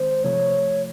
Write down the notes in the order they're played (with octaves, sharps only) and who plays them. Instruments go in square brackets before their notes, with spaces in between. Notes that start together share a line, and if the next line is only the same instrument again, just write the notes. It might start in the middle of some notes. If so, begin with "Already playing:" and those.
Already playing: [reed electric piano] D#3 G#3 C4 [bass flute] C5
[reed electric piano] C3 F3 A3 [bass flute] C#5